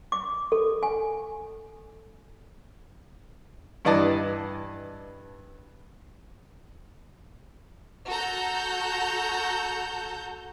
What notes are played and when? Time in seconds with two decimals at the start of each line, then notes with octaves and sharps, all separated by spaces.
0.12 D6
0.52 A4
0.83 G#5
3.85 G2 E3 D5 D#5 A5
8.08 F#4 A4 A#5 G6